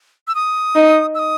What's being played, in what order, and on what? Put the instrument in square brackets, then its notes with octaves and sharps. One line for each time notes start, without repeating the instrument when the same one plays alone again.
[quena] E6
D#6
[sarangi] D#4
[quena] E6
D#6